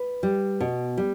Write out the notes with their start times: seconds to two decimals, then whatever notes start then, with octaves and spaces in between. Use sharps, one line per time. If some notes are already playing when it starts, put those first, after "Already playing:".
Already playing: B4
0.23 G3
0.60 B2
0.97 G3